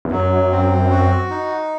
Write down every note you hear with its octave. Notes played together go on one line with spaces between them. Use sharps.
E2
F#2 F#3
C4
F#4
D#4